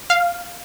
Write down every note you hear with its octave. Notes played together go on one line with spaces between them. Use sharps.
F5